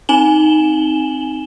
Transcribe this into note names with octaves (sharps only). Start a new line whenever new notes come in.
C4 D#4 G#5 E7 F#7 G7